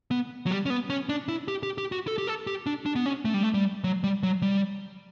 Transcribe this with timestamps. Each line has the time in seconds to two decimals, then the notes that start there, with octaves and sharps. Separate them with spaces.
0.11 B3
0.46 F#3
0.51 G3
0.66 C#4
0.70 B3
0.90 C#4
1.09 D4
1.28 E4
1.48 G4
1.63 G4
1.78 G4
1.92 F#4
2.08 A4
2.18 G4
2.27 A4
2.47 G4
2.66 D4
2.86 D4
2.96 B3
3.06 C#4
3.25 A3
3.34 G3
3.43 A3
3.54 G3
3.84 F#3
4.04 G3
4.23 F#3
4.42 G3